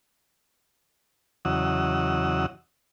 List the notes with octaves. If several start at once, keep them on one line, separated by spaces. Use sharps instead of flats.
E2 C#3 F#3 D#5 F#5 E6